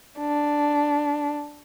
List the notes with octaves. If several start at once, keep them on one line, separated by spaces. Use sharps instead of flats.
D4